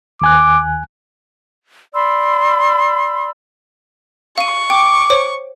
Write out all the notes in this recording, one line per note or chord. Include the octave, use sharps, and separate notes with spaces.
D#2 G#5 D6 F#6
D5 B5 C6 E6
F5 C#6 D#7
G5 D6
C5 C#5